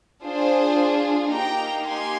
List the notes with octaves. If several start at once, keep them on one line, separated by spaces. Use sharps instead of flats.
D4 F4 G#4 C5
A#3 D#4 G4 G5 A#5
G#5 C6